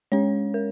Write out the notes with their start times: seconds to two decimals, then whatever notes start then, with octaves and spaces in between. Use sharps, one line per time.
0.12 G#3 C#4 C#5
0.54 A#4